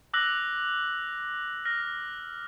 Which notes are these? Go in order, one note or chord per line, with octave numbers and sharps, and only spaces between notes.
D6 E6 F#6 A#6 F#7
F6 A#6